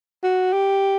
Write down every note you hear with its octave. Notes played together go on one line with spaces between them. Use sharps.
F#4
G4